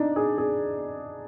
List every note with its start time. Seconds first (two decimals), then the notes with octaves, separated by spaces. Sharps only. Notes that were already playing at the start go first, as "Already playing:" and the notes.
Already playing: D4 D#4
0.16 G#4
0.38 G#4